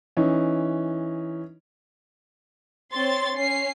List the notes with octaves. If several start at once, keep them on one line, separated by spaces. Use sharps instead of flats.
E3 C#4 D#4
C4 C#5 C6 A6
C#4 C7